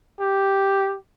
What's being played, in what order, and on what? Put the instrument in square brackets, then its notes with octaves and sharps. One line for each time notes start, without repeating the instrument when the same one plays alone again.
[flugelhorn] G4